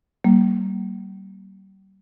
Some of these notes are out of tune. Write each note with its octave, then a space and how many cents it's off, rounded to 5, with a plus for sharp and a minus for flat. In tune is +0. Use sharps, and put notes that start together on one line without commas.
G3 -35 A#3 +0